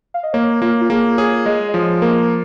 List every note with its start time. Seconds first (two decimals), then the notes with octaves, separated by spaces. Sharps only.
0.14 F5
0.23 D#5
0.33 A#3 C#5
0.62 A#3 F4
0.81 F4
0.90 A#3 G#4
1.18 G#4 C#5
1.46 G#3 D#5
1.69 D#5
1.74 F3 C#5
2.02 A#3 A#4